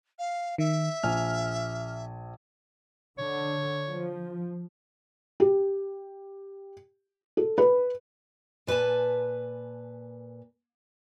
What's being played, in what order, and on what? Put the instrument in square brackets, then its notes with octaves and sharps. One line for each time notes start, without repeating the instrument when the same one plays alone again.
[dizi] F5
[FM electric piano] D#3 [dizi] E5
[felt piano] A#1 G#5 [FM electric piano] F6
[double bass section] D3 [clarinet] C#5
[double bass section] F3
[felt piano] G4
A4
B4
[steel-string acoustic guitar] A#2 B4 D5 G#5 A5